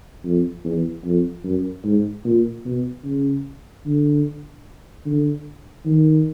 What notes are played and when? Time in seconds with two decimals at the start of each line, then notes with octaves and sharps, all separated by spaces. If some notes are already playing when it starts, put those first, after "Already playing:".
0.25 F2
0.65 E2
1.04 F2
1.44 F#2
1.84 G#2
2.25 A#2
2.65 B2
3.05 C#3
3.86 D3
5.06 D3
5.85 D#3